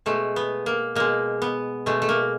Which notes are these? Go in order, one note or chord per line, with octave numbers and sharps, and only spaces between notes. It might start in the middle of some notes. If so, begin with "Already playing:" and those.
B2 G#3 A3
B3
A#3
B2 G#3 A#3
B3
B2 G#3 A3
A3
A#3